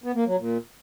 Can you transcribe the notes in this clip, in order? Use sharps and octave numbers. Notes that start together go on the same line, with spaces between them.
B3
A#3
F#3
A#2